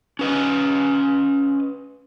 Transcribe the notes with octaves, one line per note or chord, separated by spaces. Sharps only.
C#4 B4 D#5